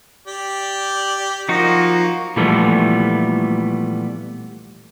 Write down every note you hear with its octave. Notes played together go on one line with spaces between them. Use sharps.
G4 D5
F3 A#3 D#4 F#4
A#2 E3 F3 G3 A3 B3